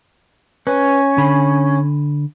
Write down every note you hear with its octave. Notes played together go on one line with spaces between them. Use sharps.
C#4 B4
D3 G#5 B5